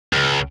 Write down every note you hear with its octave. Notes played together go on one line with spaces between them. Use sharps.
C#2